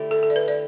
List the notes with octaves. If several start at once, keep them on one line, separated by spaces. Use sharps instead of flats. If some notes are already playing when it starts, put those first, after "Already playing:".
Already playing: D3 A3 E4 G4
A4
A4
D5
B4
D5